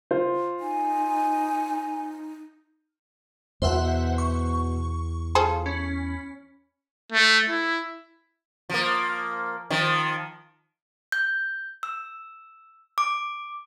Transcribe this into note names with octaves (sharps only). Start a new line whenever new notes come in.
F4 C5
D#4 G#5
E2 B2 C5 E5 F#5
C#6
F4 G#4 A4 C5
C#4 B5
A3
E4
F3 A#3
D#3 F3
G6
E6
D6